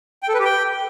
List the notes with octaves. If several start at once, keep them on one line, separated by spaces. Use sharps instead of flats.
G5
A4
B4
G4
G5